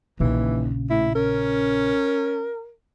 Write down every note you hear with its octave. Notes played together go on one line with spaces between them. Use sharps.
A#1 D#2 C#3 E3
A2 E4
C#4 A#4